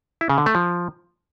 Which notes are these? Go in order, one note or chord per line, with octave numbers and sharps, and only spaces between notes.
E4
C#3
D3
A3
F3